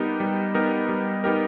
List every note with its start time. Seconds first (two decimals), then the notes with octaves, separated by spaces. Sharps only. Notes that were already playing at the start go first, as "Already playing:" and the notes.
Already playing: G3 B3 D#4 G4 A#4
0.20 G3
0.54 B3 D#4 G4 A#4
0.89 G3
1.24 B3 D#4 G4 A#4